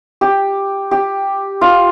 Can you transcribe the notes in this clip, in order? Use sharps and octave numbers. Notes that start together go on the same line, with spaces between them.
G4
G4
F4